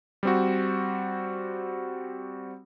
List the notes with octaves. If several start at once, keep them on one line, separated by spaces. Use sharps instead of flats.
G3 C4 F#4